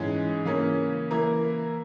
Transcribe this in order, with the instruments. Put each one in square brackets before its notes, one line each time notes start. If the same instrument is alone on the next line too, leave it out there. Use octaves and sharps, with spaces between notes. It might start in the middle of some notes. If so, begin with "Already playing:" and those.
Already playing: [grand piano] G#2 E3 G#3 C#4 G#4
C#3 E3 A#3 C#4
E3 A#3 E4 A#4